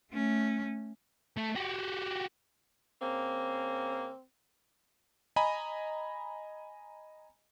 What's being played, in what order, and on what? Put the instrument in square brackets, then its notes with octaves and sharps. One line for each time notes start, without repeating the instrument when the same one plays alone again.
[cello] A3 C#4
[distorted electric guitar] A3
F#4 G4
[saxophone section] C#3 A#3 [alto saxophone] C4
[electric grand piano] D#5 G#5 A#5 B5